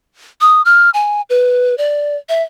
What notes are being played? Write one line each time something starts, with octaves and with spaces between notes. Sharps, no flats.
D#6
F6
G#5
B4
D5
E5